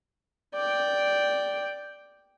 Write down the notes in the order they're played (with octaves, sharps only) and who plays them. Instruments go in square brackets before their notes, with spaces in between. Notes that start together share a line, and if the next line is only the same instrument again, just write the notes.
[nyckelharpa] D5 G5